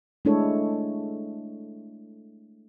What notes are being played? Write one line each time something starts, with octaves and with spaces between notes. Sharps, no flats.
G#3 A3 D4 E4 A4 C#5